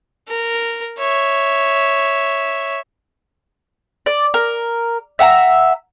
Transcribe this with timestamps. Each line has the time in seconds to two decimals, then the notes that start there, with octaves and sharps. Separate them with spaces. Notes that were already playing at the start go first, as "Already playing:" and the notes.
0.28 A#4
0.98 C#5 E5
4.06 D5
4.34 A#4
5.19 E5 F#5 A5 A#5